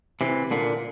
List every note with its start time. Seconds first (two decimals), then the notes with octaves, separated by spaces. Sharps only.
0.21 C3 E3
0.51 A#2 D3